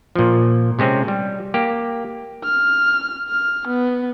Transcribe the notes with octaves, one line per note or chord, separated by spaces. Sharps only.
A#2 F3
C3 G#3 C4 C#4
G3
A#3 G4
F6
F6
B3